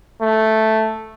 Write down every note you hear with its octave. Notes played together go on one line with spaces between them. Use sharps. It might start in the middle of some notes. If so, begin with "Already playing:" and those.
A3